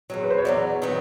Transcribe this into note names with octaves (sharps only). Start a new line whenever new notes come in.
E2 B2 F#3
B4
C5
C#5
E2 B2 F#3 D5
D#3 F#3 B3